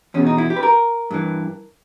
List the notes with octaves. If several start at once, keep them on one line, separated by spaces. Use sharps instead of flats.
E2 B2 C#4
D#4
E4
G4
B4
A#4
G2 E3